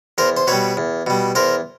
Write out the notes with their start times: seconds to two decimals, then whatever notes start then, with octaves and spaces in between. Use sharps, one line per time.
0.18 E2 A#4 C5
0.37 C5
0.47 B2 G3 B4 C#5
0.77 E2
1.07 B2 G3
1.35 E2 A#4 C5